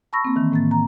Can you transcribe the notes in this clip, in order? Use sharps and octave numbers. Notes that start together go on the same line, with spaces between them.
A5 B5 C#6 E6 A#6
A#3 C4
D#3 E3
A2 A#3 A6
A#5